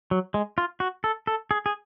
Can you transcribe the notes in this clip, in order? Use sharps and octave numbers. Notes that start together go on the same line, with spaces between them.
F#3
G#3
F4
F#4
A4
A4
G#4
G#4